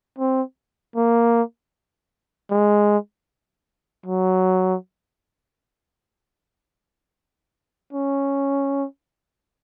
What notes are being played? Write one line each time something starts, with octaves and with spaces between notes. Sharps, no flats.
C4
A#3
G#3
F#3
C#4